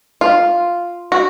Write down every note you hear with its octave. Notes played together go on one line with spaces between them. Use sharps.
F4
F#4